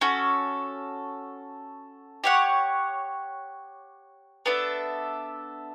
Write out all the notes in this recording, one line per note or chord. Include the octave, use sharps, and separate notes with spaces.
C#4 F#4 A4
G4 C#5 F#5
B3 D4 A4 E5